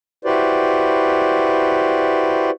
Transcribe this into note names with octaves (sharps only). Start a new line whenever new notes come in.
E4 F#4 G4 B4 C5 D5